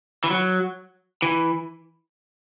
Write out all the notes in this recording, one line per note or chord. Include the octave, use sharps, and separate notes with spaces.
E3
F#3
E3